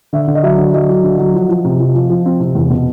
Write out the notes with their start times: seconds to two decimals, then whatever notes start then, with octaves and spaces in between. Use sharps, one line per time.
0.13 D3 E5
0.28 D3
0.35 D#5
0.43 F#3 E5
0.58 D3
0.74 F#3 D#5
0.89 F#3
1.04 D3
1.18 F#3
1.34 F3
1.49 F3
1.65 C3
1.80 F3
1.94 F3
2.10 F3
2.26 C4
2.40 C3
2.55 E2
2.70 B2